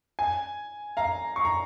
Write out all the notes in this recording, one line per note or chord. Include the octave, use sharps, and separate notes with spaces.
G#5
F5 A#5
C#6
A#5